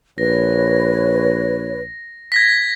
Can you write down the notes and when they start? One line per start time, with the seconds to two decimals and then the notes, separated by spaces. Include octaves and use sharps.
0.18 A#1 B4 C#5 A#6
2.32 G#6 A#6 B6